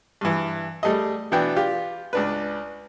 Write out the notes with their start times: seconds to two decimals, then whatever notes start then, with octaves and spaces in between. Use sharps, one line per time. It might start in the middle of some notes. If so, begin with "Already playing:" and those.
0.21 G2 E3
0.83 G3 A3 G#4 D#5
1.32 B2 E3 B3 D4 G5
1.56 F4 G4
2.13 C#2 D4 B4